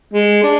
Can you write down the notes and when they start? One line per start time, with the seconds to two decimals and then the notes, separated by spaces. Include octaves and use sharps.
0.13 G#3
0.43 D4